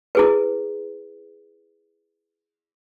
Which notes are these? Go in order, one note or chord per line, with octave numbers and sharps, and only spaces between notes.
E4 G#4 B4